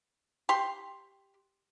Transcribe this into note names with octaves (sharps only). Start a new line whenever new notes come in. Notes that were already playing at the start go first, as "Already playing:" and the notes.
G4 C6